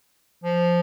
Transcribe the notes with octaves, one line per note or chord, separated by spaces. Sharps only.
F3